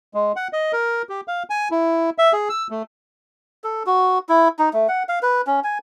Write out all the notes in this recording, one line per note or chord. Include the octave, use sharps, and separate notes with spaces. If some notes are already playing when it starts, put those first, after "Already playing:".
G#3
F#5
D#5
A#4
G4
F5
G#5
E4
E5
G#4
E6
A3
A4
F#4
E4
D#4
A3
F#5
F5
B4
C#4
G#5